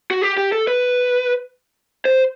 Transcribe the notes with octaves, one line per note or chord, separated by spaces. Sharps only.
F#4
G4
G4
A4
B4
C5